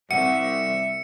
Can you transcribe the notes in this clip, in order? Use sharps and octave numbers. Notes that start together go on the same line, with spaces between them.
C2 E5 F#5 C#7